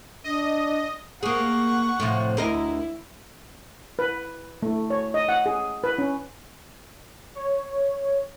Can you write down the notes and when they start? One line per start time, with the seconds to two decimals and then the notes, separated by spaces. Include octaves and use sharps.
0.24 D4 D#5
1.23 A#3 G#4 F#5 C#6
2.00 A2 C3 F3
2.37 D2 E4 A#4 D#5
3.99 B4
4.63 A3
4.90 C#5
5.14 D#5
5.29 F#5
5.46 G#4
5.84 B4
5.98 C#4
7.35 C#5